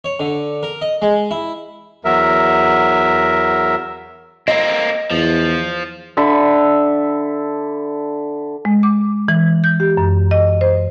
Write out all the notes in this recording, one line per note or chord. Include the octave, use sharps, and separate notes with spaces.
C#5
D3
A#4
D#5
G#3
E4
E2 F#3 A#4 E5
A#3 C4 D#5
E2 F3
D3 E5 B5
G#3
D6
E3
G6
G4
F#2
D#5
C5